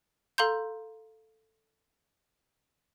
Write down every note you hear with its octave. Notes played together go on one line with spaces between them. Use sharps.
A4 F5 A#5 C6 G6